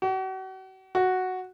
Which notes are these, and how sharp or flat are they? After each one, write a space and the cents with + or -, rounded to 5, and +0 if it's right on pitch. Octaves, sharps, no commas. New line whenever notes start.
F#4 +40
F#4 +0